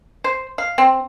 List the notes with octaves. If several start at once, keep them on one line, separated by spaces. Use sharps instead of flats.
C5
F5
C4